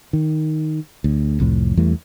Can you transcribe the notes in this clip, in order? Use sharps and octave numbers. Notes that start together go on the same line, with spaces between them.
D#3
D2
C2 F2 A2
E2 E3 G3 A3